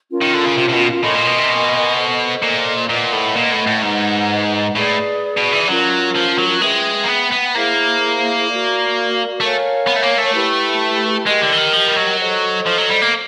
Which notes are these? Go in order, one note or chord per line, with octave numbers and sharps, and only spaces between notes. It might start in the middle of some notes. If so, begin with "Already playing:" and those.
C#4 F4 A#4
D#3
D3
C#3
C3
C3
B2
A2 A#4 D#5 G#5 C6
A#2
B2
C3
B2
A4 C5 D#5
A#2
A#2 B4 D#5 F#5
A2
A#2
A2
A2
G#2 B4 D#5 F#5 A#5
A2 G#4 B4 D5
B2
E3
F#3 C#4 F4 A#4
F3
F#3
G#3 G#4 B4 E5 G5
A#3
B3
B3
A#3 E4 G#4 C5 E5
F#4 A#4 D5 F5
A3 A#4 C#5 F5 G#5
B3
A3
A#3
A3
E4 G4 B4
G#3 G4 A#4 D#5 G5
D3
E3
D#3
F3
G3
F#3
A4 C5 D#5
F3
F#3
G3
A#3